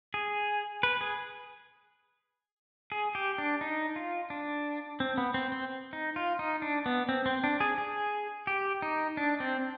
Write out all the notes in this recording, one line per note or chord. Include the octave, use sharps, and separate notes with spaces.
G#4
B4
G#4
G#4
G4
D4
D#4
F4
D4
C4
B3
C4
C4
D#4
F4
D#4
D4
B3
C4
C4
D4
G#4
G#4
G4
D#4
D4
C4